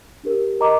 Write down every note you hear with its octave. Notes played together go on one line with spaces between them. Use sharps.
D4 G4 A#4
A#4 D#5 A#5 D6